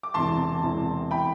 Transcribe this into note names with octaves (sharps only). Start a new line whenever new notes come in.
D6
E1 E2 C3 E3 A5 C6
E1 E2 C3 E3
E3 G5 B5